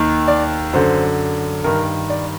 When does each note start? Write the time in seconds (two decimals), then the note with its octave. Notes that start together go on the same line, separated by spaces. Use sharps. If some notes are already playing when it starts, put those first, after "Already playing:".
Already playing: D#2 D#3
0.28 D5
0.73 F#2 D3 C5
1.64 G2 D#3 A#4
2.10 D5